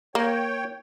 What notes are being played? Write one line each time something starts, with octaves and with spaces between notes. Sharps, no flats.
A#3 C#5 G5